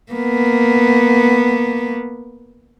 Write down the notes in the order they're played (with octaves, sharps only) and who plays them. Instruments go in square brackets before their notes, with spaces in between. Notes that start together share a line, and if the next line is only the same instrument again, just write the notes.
[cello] A#3 B3